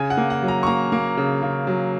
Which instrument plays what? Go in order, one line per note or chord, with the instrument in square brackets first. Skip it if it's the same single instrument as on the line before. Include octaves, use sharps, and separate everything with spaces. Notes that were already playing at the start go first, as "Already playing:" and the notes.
Already playing: [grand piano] C#3 G#5
F#5
A#3
F#5
F#3
A#5
C#6
A#3 A#5
A#3
C#3
C#3
F#3